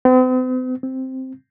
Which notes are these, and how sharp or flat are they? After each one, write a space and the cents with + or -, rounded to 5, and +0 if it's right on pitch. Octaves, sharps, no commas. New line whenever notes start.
C4 -45
C4 +0